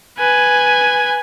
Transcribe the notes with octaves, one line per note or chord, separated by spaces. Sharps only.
B4 G#5